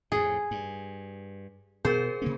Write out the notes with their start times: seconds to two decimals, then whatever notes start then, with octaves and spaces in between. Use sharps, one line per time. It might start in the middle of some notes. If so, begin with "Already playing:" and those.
0.12 F2 A2 G#4
0.51 G2
1.85 B2 G#4 A#4 C5
2.22 C3 A#3 C#4